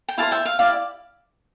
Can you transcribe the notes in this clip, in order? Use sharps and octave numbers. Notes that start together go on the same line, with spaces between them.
G5
E4 G4 C5 F5 A5
E5 G5
F5
E4 G4 D5 F5